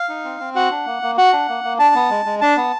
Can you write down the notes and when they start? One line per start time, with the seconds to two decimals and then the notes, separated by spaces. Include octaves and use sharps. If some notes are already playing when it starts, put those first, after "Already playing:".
Already playing: F5
0.09 D#4
0.24 C4
0.40 C4
0.56 F#4 F#5
0.71 D4
0.86 A#3
1.03 A#3
1.18 F#4 F#5
1.33 D4
1.48 A#3
1.64 A#3
1.79 D4 A5
1.95 B3
2.10 G#3
2.25 G#3
2.41 D4 A5
2.57 B3